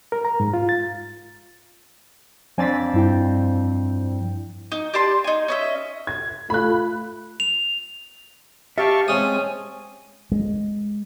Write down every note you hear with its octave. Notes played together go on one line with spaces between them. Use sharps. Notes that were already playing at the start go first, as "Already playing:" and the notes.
A#4
A#5
G#2
F4
A6
F2 C4 D4 G#5 A6 B6
G2 E4 G5
D#4
G4 D5 A5 C6
D#4 G#5
C#4 D#5 E5
G#6
A3 F4 B5 F#6
F7
G4 E5 F5 A5 C#6
G#3 C4 C#4 G#5 D#6
G#3